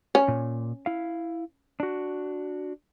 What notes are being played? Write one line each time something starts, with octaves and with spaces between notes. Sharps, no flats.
C#4
A#2
E4 F5
D4 F#4